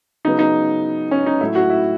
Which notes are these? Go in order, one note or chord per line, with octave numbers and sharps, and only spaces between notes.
C#3 F#3 B3 D#4
D#4
C#4
D#4
A2 F#3 A3 E4
F#4
E4